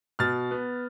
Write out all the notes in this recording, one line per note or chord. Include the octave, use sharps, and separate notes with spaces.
B2 F6 A6
B3